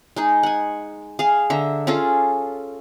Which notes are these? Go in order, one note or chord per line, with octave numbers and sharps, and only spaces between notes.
G#3 D#4 G#4
F#5 G#5
G#4 F5
D3 E5 A#5
C#4 F4 G#4 A4